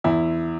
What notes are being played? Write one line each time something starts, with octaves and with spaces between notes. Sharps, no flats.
E2 E4